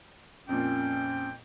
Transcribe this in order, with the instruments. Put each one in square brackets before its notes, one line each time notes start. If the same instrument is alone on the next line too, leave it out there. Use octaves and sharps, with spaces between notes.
[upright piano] F2 A#2 [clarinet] C#4 [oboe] G5